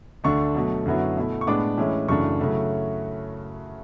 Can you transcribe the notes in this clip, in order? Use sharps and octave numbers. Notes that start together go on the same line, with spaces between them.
D2 D3 A3 D4 C#6
B2 F#3 A3
F#2 D3 F#3 B3 E4
B2 A3 E4
C#6
A2 G#3 B3 D4 D6
A2 E3 G#3 C#4 E4
F#2 C#3 E3 A3 D4 C#6
C#3 F#3 A3 E4